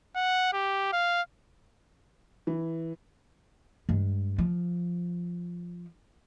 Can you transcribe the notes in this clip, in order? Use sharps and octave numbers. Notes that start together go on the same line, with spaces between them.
F#5
G4
F5
E3
G2 G#3
F3